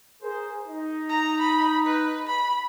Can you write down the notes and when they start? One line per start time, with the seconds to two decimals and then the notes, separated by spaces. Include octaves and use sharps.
0.22 G#4 A#4 C5
0.68 D#4
1.09 A#5
1.40 B5
1.85 B4
2.27 B5